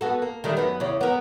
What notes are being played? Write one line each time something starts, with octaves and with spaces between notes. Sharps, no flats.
B3 F#4 A4
A#3
D#3 G3 A3
F#2 B3
E2 C#3
B3 A#4